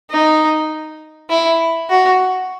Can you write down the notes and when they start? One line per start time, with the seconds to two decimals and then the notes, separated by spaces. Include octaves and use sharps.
0.11 D#4
1.30 E4
1.90 F#4